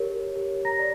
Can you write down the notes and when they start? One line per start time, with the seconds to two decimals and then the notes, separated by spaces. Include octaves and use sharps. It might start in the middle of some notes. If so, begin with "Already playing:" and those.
Already playing: G4 A#4 C#5
0.36 G4 C#5
0.65 A#5 A#6
0.79 D5